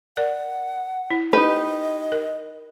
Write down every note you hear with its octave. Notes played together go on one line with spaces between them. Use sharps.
A#4 D5 F#5
E4
D#4 G4 B4 D#5
A#4